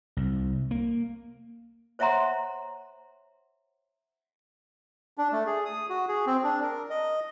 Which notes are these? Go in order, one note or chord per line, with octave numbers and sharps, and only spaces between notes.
C2
A#3
C5 C#5 E5 F#5 A#5 C6
D4
A3
G#4
D#6
F#4
G#4
C4
D4
A#4
D#5